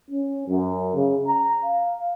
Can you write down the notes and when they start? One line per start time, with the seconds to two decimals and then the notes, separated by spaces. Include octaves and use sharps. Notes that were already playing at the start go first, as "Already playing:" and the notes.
0.10 C#4
0.48 F#2
0.95 C#3
1.27 A#5
1.65 F5